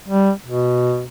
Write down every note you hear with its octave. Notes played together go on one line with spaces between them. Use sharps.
G3
B2